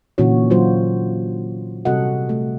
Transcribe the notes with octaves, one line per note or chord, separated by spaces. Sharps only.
A#2 D3 E3 C#4 F#4 C#5
D3 F#3 F4 F#4 C5
C3 G3 F#4 A4 D#5 F#5
A3